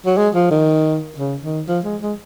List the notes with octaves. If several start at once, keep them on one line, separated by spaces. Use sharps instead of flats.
F#3
G#3
F3
D#3
C#3
D#3
F3
G#3
G#3